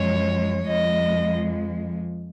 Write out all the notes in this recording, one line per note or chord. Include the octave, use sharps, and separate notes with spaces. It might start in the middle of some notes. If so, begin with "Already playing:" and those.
Already playing: F#2 F3 G#3 C#5
F2 F3 G#3 D#5